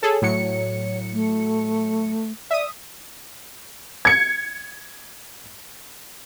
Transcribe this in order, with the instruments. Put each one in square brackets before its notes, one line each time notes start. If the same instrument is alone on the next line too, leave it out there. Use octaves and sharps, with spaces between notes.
[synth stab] G#4 A4 [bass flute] C#5
[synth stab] A2 F#3 C#7
[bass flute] A3
[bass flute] D5 [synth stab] E5 D#6
[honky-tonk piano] G#6 C#7